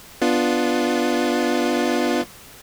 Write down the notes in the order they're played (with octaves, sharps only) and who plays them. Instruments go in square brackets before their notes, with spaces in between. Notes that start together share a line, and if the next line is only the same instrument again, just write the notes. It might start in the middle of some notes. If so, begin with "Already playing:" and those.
[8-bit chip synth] B3 D4 F4